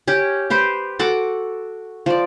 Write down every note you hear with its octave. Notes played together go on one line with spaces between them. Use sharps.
C#4 G4
G4 B4 C5
F#4 A4 F#5 D6
F3 D5